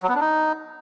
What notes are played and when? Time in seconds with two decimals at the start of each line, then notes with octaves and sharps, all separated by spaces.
0.03 F#3
0.09 B3
0.15 D4
0.21 D#4